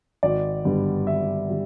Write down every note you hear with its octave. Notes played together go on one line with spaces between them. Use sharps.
G#1 D5
G2 D3 G3 B3
G#1 E5
D3 G3